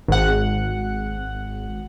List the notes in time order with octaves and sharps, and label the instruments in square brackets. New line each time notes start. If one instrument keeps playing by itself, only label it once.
[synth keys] G#1 F#5